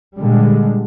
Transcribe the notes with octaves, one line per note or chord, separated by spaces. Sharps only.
A#2 D3 G3 G#3